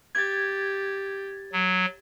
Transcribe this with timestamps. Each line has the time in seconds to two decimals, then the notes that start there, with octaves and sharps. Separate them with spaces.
0.15 G4 G#6 A6
1.52 F#3